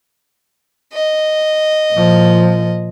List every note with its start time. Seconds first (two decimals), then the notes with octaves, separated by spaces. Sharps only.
0.93 D#5
1.93 A#2 F3